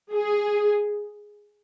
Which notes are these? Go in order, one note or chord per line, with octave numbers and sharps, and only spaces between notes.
G#4